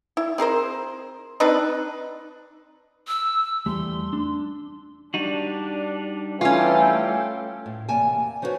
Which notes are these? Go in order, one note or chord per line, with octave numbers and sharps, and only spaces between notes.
E4
C4 G#4 A#4 C5
C4 D4 D#4 B4
E6
E2 G3 A3 C6
D4
G3 D4 D#4 F#4
E3 A3 C#4 F4 A4 G5
A2
E2 C3 A#3 G#5 A5
F3 D#4 F#4 G4 B4 C#5